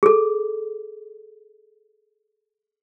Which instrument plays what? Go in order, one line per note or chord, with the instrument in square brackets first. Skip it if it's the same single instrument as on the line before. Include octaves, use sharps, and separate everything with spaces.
[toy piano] G#4 A4